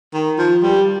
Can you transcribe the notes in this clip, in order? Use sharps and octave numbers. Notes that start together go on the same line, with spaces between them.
D#3
F3
G3